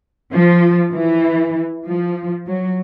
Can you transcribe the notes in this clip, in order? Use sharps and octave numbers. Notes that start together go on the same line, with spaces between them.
F3
E3
F3
F#3